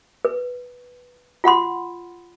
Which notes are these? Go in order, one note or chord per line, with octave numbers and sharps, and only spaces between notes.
B4
F4 F#5 B5 C6